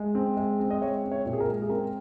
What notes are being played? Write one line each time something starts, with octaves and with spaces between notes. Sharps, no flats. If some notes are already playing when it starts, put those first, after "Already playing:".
Already playing: G#3
C4
G#3
C4
D#5
G#3 C#5
C4
C#5
A#2
G#4
A#4
G#3
G#4
C4 A#4